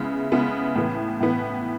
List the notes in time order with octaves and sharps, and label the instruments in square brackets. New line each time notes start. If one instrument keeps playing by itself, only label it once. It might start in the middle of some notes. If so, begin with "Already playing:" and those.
Already playing: [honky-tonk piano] C#3 G#3 B3 E4
C#3 G#3 B3 E4
A2 E3 B3
A2 E3 B3